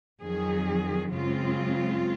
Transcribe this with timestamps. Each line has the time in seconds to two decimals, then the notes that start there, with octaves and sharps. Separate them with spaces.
0.22 F2 D#3 F#3 G#4
1.12 F#2 C#3 G#3 C4 F4